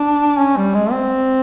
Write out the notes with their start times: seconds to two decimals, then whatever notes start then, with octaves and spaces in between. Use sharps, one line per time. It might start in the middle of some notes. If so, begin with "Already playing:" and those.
Already playing: D4
0.39 C#4
0.57 G3
0.74 G#3
0.92 C4